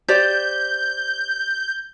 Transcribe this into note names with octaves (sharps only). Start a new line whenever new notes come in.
G4 C5 D5 G6